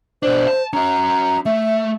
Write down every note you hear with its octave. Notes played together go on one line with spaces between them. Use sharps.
B2 D4 C5
A5
C#4 F#4 A#5
A3 E5